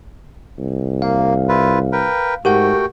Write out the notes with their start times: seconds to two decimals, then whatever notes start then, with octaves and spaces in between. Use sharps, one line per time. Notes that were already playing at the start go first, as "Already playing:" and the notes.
0.58 C2
1.02 A#3 F5
1.49 E4 F4 B4
1.92 A#4 B4 G5
2.45 G#2 A3 F#4 G4 A#4 F#5 G5